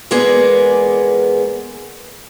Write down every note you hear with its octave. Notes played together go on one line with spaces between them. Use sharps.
E2 G#3 A#3 B3 G#4 D5